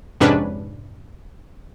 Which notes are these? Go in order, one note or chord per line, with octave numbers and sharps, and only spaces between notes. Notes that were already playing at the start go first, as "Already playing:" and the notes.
F2 G#2 C3 C#4 D4 B4